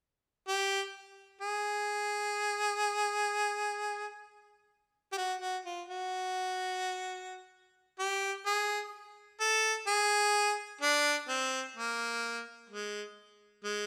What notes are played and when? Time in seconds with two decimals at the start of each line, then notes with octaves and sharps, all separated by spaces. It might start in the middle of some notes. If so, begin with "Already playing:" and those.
0.48 G4
1.41 G#4
5.13 G4
5.18 F#4
5.41 F#4
5.65 F4
5.89 F#4
7.99 G4
8.46 G#4
9.41 A4
9.87 G#4
10.81 D4
11.28 C4
11.76 A#3
12.69 G#3
13.64 G#3